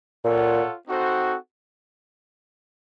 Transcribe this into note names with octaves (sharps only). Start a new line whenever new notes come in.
A#2 F4 A4 C#5 F#5
C4 D#4 F#4 A4 C5